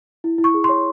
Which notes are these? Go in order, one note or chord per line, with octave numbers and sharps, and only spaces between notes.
E4
E4
C#6
G#4
C6
C#5